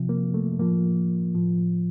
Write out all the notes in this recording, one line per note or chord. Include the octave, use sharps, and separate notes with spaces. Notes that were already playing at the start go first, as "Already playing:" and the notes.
Already playing: C3 F3
A#3
A3
A2 F3 A#3
A2 F3